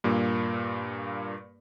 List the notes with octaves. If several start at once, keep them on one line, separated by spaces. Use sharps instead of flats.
G2 A#2 A#3